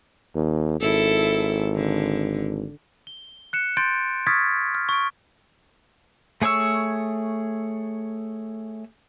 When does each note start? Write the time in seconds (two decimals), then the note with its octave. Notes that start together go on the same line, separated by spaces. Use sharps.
0.35 D#2
0.81 G#1 E4 A4
1.76 D3
3.07 G7
3.53 F#6 C#7 E7
3.77 C6 G6 A6 D7
4.27 C#6 D#6 F6 G#6 A6 B6
4.75 F6
4.89 C#6 D7
6.42 A3 G#4 C#5 C#6 E6